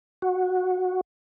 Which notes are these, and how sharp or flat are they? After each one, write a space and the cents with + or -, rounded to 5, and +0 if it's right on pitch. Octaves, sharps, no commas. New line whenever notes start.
F#4 -10